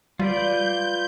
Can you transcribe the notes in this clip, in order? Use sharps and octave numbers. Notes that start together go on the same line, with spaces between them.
G3 F4 B4 D5 G6